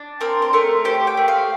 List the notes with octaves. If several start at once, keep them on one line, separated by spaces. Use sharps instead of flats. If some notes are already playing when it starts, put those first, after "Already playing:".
Already playing: D4
C4 A#4
C5
A3 A#4
G4 C5
G5
A3
F5